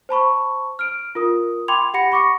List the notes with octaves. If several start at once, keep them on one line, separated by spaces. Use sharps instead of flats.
C5 A5 B5 C#6
F6 D7
F4 A#4 D#6
G5 B5 C6 D6 G#6 F7
G4 F#5 B5 A#6 C#7
B5 C#6 D6 A#6 C#7